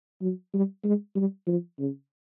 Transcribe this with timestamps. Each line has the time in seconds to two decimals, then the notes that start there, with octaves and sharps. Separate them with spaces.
0.22 F#3
0.54 G3
0.84 G#3
1.16 G3
1.47 F3
1.79 C#3